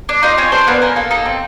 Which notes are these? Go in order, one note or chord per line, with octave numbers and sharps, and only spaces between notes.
D4
D#4 F4 D#5
C4 C#4 C#5
C4 D4 C5
A#3 B3 B4
C#4 A#4
A#3 A4
D#4 A4
C4